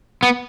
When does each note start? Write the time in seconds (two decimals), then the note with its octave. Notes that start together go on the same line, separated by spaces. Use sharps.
0.23 B3